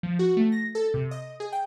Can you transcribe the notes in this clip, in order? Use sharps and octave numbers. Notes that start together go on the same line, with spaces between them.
F3
F#4
A3
A#6
A4
C3
D#5
G#4
G5